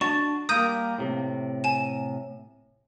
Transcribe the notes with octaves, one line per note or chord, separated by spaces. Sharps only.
D4 F#4 A5 C#6
G3 A#3 A#4 D#6 G6 D#7
A2 C3
G#5 E7